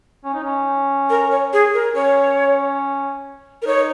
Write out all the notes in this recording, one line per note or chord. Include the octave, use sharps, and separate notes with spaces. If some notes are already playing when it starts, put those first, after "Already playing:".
C#4
D#4
C#4
A#4
C#5
G#4
A#4
C#4 C#5
A#4
D#4 C#5